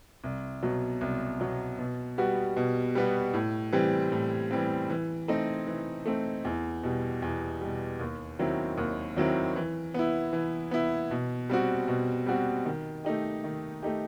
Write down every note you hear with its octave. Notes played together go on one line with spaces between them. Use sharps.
C2
B2 F#3
C2
B2 F#3
B2
G3 B3 F#4
B2
G3 B3 F#4
A2
E3 G3 C4
A2
E3 G3 C4
E3
A3 C4 D#4
E3
A3 C4 D#4
E2
B2 G3
E2
B2 G3
D#2
D#3 F#3 C4 E4
D#2
D#3 F#3 C4 E4
E3
B3 E4
E3
B3 E4
B2
G3 C4 F#4
B2
G3 C4 F#4
D#3
A3 D#4 G4
D#3
A3 D#4 G4